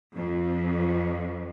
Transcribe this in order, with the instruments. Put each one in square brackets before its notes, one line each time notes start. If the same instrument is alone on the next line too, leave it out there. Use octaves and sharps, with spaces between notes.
[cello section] F2